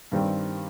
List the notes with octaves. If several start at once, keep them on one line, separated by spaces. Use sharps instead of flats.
G2 D#3 G3 C4 G4